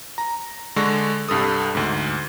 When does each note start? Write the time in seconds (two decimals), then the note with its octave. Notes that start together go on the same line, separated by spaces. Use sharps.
0.18 A#5
0.76 D3 G#3 D4 C#6 A#6
1.29 C2 G2 A4 D#6
1.75 D2 G#2